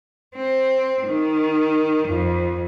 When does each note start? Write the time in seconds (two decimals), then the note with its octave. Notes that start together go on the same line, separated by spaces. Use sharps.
0.36 C4
1.07 D#3
2.08 F2